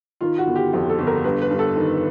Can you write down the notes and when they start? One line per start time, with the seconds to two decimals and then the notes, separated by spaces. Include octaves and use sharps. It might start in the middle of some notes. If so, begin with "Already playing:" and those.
0.21 D#3 F4
0.38 F#4
0.47 G1
0.56 G4
0.73 F2
0.89 A4
0.99 G1
1.07 A#4
1.24 G2 B4
1.42 B4
1.51 G2
1.59 A4
1.76 D#3